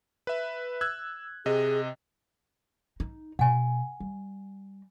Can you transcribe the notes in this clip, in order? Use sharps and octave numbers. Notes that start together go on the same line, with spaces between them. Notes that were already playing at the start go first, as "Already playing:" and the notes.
B4 E5
E6 F#6 G#6
C3 G#4 D#5
D#4
B2 F#5 G#5
G3